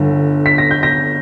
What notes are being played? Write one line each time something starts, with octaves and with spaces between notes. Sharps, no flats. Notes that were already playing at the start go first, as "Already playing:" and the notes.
Already playing: G1 G2 D3
B6
A#6
G6
A#6